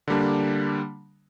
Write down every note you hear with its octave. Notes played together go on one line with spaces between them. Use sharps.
D3 G3 A#3 D4